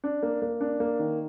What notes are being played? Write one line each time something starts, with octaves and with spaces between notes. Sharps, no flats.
D4
A#3
A#3
D4
A#3
D#3